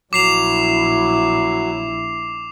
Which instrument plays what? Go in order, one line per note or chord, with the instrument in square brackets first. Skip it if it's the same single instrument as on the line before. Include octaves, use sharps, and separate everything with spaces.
[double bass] A#1 E4 [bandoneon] F#3 [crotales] D6 C7 F7